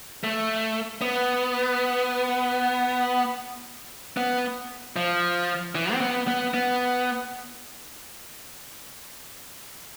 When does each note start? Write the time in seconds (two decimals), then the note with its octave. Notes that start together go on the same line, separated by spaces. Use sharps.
0.24 A3
1.01 B3
4.17 B3
4.96 F3
5.75 E3
5.93 C4
6.01 B3
6.28 B3
6.54 B3